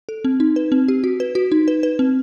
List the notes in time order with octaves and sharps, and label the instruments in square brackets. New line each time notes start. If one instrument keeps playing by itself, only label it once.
[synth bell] A4
C4
D#4
B4
C4
G4
F#4
B4
F#4
D#4
B4
B4
C4